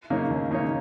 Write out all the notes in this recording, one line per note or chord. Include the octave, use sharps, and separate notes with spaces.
C#3 A#3 D#4 C#5
D#2
C#3 A#3 D#4 C#5